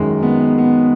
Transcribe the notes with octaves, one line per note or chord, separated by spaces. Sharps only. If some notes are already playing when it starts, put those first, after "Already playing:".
Already playing: F#2 D#3 G#3
B3
B3